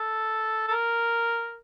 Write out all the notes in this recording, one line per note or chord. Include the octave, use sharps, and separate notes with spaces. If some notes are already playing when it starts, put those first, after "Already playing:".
Already playing: A4
A4
A#4